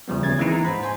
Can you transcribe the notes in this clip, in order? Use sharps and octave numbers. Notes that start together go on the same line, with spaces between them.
E2 C#3 F3 G3 B3
D2 C#3 C#4 G#6 A6
E3 G#3 A#3 C4 D#4 E4
A#5
G#2 C5 B5
C5 G#5 C6